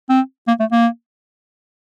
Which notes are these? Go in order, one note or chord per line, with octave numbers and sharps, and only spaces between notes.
C4
A#3
A3
A#3